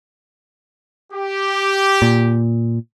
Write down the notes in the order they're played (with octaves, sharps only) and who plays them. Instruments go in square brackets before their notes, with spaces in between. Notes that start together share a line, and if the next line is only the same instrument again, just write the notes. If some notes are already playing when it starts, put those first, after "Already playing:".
[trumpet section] G4
[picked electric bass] A#2